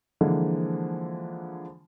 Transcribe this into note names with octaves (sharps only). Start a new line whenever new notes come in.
D3 E3 F3 G#3 A#3